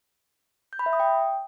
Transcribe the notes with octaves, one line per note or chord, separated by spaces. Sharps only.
G6
B5
E5
D#6
G5